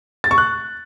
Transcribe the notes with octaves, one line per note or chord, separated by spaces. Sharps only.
A6
C#6
F#6